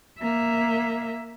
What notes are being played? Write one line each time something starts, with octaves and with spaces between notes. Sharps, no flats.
A#3 E5